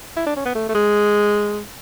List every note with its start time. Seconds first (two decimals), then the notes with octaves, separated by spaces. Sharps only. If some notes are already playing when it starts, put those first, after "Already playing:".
0.17 E4
0.26 D4
0.36 C#4
0.45 B3
0.55 A3
0.69 A3
0.74 G#3